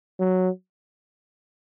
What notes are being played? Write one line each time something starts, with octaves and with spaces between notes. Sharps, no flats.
F#3